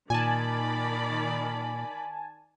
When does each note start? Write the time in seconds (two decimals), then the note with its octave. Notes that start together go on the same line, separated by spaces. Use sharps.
0.10 A#2 D#3 D5 G#5 A5 B5